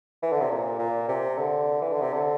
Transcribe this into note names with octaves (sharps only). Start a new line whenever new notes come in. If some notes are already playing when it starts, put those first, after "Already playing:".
E3
D3
C3
A#2
A#2
C3
D3
E3
D3
C3
D3